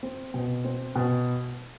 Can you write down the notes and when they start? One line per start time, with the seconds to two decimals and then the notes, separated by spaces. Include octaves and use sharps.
0.03 C4
0.34 B2
0.64 C4
0.96 B2